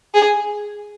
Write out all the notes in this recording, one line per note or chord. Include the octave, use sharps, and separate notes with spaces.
G#4